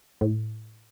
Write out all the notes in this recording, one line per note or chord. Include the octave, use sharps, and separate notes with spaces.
A2